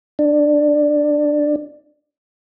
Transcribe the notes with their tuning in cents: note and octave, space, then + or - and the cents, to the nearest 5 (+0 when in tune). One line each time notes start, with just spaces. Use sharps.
D4 +10